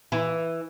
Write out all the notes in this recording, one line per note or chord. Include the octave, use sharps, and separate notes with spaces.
E3